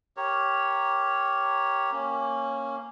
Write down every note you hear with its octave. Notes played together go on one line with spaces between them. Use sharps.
G4 A#4 C#5
A#3 C#4